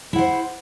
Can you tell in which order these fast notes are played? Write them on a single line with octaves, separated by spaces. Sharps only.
E4 F#5 C5